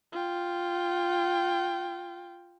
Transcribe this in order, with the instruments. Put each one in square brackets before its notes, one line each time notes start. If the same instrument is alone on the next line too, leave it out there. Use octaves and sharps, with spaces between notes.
[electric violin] F4 G5